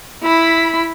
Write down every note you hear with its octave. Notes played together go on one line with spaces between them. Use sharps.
E4 B5